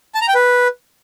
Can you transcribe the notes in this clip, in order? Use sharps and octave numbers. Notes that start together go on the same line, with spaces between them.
A5
A#5
G5
B4